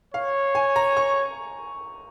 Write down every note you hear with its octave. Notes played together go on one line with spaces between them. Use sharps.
C#5 F5
G#5
A#5
C#6